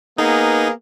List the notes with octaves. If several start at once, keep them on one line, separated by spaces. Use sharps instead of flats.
A#3 B3 D#4 G#4